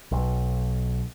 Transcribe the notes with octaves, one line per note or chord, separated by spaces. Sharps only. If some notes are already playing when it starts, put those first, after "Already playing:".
B1